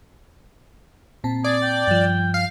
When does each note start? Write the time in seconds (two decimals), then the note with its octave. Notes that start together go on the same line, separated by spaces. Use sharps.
1.24 A#2 C4 A5
1.44 G#4 D5
1.63 G5
1.87 G2 F3
2.34 F5